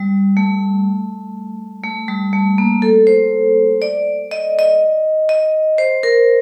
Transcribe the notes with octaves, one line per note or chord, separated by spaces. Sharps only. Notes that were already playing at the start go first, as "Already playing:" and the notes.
Already playing: G3
A3
A3
G3
A3
A#3
A4
C5
D5
D#5
D#5
D#5
C5
A#4